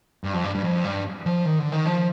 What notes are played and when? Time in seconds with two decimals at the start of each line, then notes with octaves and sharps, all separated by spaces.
0.24 G2
0.33 F2
0.44 G2
0.55 G2
0.64 F2
0.84 G2
1.26 F3
1.45 D#3
1.59 D3
1.72 D#3
1.86 F3